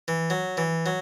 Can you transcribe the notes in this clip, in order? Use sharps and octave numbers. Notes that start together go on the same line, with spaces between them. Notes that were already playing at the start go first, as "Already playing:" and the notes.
E3
F#3
E3
F#3